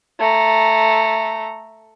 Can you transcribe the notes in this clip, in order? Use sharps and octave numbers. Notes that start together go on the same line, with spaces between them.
A3 A#5